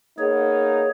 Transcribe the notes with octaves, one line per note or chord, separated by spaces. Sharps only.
A#3 B3 D#4 G#4 C#5